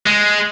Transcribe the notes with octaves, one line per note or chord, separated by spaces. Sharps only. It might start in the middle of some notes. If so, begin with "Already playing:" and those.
G#3